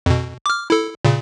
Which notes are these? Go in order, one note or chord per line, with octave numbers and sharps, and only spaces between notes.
F2 B2
D6 F6
E4 A4
A#2 C#3